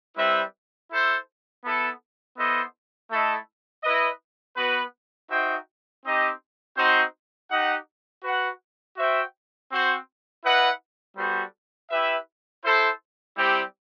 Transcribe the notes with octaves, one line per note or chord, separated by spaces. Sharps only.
G3 C4 E4 B4 E5
E4 A4 C5
B3 E4 A4
B3 E4 A4 C5 D#5
A3 E4 A4 D#5
E4 B4 D#5
B3 F#4 B4
D#4 F#4 C5 E5 G5
C4 D#4 G4 D#5
C4 D#4 F#4 C5
D#4 G4 D#5 F#5
F#4 B4 F#5
F#4 C5 E5 G5
C4 F#4 C5
E4 B4 D#5 F#5
G3 B3 F#4 A4 C5
E4 G4 B4 E5
E4 A4 C5
G3 C4 E4 G4